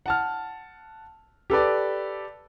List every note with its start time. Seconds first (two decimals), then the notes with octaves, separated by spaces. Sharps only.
0.06 F#5 A5 F6
1.50 G4 A4 B4 D5